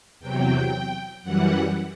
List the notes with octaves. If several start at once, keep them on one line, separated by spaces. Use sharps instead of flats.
E2 C3 F#3 G5
F#2 E3 G3 F#5